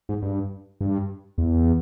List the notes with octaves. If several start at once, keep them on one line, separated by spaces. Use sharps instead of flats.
G#2
G2
G2
E2